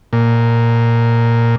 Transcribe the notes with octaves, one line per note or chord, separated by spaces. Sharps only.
A#2